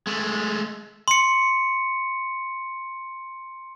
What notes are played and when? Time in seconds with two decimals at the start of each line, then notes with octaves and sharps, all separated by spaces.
0.07 G#3 A3
1.08 C6 C#7